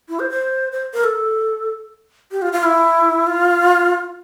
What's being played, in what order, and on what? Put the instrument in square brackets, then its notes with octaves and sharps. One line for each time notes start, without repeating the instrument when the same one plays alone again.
[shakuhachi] E4
C5
C5
C5
A#4
A4
G4
F4
F4
E4
F4